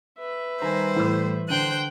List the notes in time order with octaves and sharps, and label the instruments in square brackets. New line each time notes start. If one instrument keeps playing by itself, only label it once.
[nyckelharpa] B4 E5
[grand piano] D#3 [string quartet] G3 C5 [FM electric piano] G#5 A#5
[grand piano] A2 E6 [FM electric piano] E3
[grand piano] D3 D#7 [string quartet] C5 G5 F#6